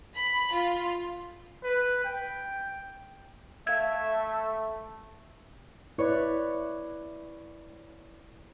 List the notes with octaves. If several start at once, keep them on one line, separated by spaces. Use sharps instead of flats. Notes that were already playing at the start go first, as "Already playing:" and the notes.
B5
F4
B4
G5
A3 E5 F5 G#6
E4 B4 C#5 D5